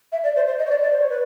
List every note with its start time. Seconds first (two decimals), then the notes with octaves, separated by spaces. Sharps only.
0.12 E5
0.23 D5
0.36 C5
0.47 C5
0.58 D#5
0.66 C#5
0.70 D5
0.82 D5
0.92 C5
1.00 C#5
1.10 B4